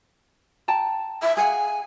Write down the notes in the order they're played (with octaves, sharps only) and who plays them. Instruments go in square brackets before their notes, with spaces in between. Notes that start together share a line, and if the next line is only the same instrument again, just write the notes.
[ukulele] G5 A5 A#5
[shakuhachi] E5
[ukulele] G#4 F5 F#5 [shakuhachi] G#5